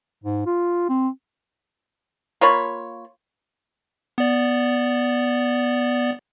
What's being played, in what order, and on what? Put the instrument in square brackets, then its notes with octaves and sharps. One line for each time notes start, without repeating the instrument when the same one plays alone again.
[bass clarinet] G#2
F4
C4
[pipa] A#3 F4 C#5 B5
[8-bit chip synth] B3 D5